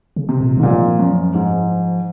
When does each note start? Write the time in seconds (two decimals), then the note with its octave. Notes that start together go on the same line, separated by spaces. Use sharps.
0.16 C#3
0.29 C3
0.40 A#2
0.57 G#2 D#3
0.63 A#2 F3
0.99 F#2
1.34 G#2